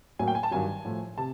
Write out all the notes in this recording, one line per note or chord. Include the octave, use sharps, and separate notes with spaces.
A2 F#3 A#3 G#5
G5
G#5
A5
G2 D#3 F#3 G#5
A2 F3 A3
C3 A5